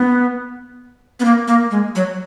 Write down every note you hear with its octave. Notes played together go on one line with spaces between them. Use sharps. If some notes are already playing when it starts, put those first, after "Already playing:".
Already playing: B3
B3
A#3
A#3
G#3
F#3